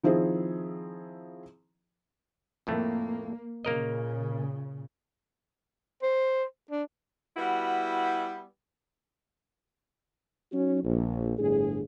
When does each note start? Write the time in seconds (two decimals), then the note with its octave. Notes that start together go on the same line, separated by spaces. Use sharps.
0.04 D#3 F3 C4 E4 G#4
2.67 F2 A2 A3 A#3
3.65 A#2 C#3 A#3 A#4 D#5
6.03 C5
6.71 D4
7.37 G3 B3 E4 F#4
10.52 F#3 C#4 D#4 F#4
10.84 A#1
11.38 G1 A2 D4 G#4